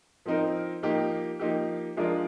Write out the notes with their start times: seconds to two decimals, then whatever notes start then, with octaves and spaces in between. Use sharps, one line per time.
0.26 F3 C4 D#4 A#4
0.83 F3 A#3 D#4 G4
1.39 F3 A#3 D#4 G4
1.97 F3 G#3 D4 F4 A#4